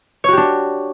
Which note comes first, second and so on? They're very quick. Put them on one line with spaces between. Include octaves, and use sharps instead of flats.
C#5 F#4 G4 D4